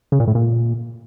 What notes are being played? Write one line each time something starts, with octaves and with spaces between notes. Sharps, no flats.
C#3
A#2
A2
A#2